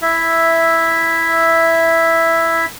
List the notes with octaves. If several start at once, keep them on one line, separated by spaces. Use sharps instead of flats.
E4 E5